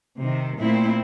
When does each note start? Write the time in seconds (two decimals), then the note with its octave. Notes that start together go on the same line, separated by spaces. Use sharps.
0.18 C3 D#3
0.58 A#2 A3 C4 E4